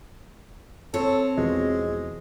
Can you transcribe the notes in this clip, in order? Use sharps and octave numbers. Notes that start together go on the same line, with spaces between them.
C4 A4 C#5
E2 B2 F3 G#3